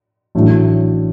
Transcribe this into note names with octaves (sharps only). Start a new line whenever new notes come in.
A1 A2 F#3 A3 D4